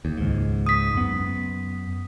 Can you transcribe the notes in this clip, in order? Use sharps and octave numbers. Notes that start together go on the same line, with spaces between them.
D#2
C#2 G#2
D#6 B6
F#2 B3